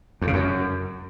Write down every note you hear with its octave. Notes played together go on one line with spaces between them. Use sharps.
F2
C#3
F#2